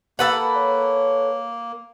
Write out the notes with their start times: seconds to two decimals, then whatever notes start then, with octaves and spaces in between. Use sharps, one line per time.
0.19 A#3 A4 B4 F#5
0.57 C#5